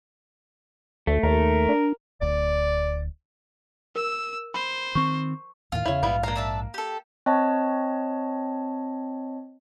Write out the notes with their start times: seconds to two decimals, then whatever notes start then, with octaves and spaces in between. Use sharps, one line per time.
1.07 D2 A3
1.23 D#2 A#4
1.69 D4
2.21 D1 D2 D5
3.96 A#4 E6
4.54 C5 B5
4.95 D#3 C4 C#6
5.72 D#2 A2 D#3 F4 F5
5.85 E2 C#3 E4 C#5
6.03 A#1 G#2 G3 B3 E4
6.23 A#3 D4 F5 A#5
6.36 D4 E5 A5
6.74 G4 A4
7.26 C4 C#5 D#5 A5